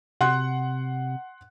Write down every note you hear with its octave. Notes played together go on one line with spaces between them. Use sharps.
C3 F#5 C6 F#6